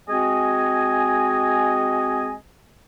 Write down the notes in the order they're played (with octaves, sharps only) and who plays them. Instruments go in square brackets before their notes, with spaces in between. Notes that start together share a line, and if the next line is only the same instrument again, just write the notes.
[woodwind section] G#3 C4 F#4 D#5 G#5